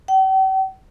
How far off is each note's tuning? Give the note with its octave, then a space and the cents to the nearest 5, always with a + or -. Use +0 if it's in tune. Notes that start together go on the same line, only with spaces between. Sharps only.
G5 -45